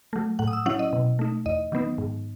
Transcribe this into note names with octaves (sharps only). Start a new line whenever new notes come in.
F#3 A3
A2 F#5
D#6
E6
F#3 C#4 E4 F#5
D#5
B2
A3 D#4
E2 D#5
D#3 F#3 B3 D#4
G#2